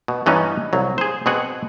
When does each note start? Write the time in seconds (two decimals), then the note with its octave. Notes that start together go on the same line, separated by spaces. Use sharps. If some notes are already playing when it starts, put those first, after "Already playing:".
0.08 B2
0.26 G2 E3 B3 C#4 D#4
0.73 C2 F#3
0.98 G#4 C5
1.26 B2 C4 G#4 F#5